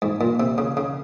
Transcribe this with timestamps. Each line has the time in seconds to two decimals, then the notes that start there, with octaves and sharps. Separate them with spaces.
0.02 G#2
0.21 A#2
0.40 C3
0.58 C#3
0.77 C#3